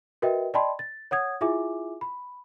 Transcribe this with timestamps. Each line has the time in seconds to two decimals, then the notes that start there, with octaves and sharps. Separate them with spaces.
0.22 F#4 A#4 B4 D#5 E5 G5
0.54 D5 D#5 G5 A5 B5 C6
0.79 A6
1.11 C#5 F#5 D#6 G#6
1.41 E4 F4 G#4 E5 G#5 D6
2.01 B5